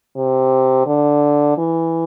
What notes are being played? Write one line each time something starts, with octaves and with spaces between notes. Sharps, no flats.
C3
D3
E3